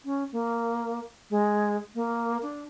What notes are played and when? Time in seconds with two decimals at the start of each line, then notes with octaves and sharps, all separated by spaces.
0.05 C#4
0.32 A#3
1.30 G#3
1.95 A#3
2.42 D4